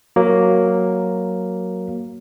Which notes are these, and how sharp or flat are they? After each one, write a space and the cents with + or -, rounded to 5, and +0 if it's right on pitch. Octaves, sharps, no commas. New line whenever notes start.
F#3 +0 A#3 +0